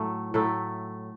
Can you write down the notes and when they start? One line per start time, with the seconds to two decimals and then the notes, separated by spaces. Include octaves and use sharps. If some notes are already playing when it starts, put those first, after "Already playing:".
Already playing: A2 F#3 A3 E4
0.34 A2 F#3 A3 E4